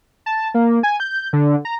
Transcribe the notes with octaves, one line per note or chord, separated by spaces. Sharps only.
A5
A#3
G#5
G6
D3
A#5